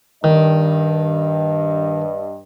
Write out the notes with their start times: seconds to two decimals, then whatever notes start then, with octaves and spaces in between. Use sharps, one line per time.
0.24 G2 D#3 D#5